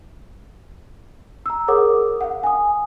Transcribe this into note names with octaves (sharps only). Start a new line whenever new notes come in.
A#5 E6
G#4 A#4 C#5 F#5 D6 D#6
F5 F#5
G#5 D#6